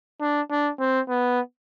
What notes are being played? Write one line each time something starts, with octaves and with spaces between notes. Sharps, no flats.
D4
D4
C4
B3